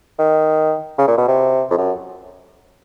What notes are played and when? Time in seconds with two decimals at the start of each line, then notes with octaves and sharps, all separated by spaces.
0.19 D#3
0.98 C#3
1.08 A#2
1.18 B2
1.28 C3
1.70 F2
1.78 F#2